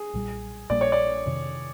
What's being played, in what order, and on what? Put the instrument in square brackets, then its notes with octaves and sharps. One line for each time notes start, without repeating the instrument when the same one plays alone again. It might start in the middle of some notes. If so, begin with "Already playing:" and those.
Already playing: [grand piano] G#4
[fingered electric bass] B1 A#2 G3
[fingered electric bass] A#1 A#2 G3 A#3 [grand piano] D5
[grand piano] C#5
D5
[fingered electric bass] F2 C3 D#3